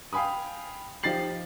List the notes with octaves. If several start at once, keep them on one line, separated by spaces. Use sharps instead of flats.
F5 G5 G#5 B5 D#6
F3 D#4 G4 A6 C7 F#7